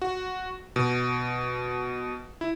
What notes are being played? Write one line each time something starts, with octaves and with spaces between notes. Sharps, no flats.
F#4
B2
E4